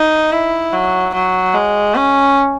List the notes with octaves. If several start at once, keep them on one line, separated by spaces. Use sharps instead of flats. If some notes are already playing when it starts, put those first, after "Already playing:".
Already playing: D#4
E4
F#3
F#3
G#3
C#4